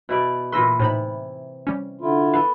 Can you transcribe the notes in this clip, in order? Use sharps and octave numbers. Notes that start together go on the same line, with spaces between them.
B2 E4 D5
A#2 E3 B4 C6 E6 A#6
A2 C3 D#4 B5
G3 C#4
D3 E4 F4
B3 A4 F5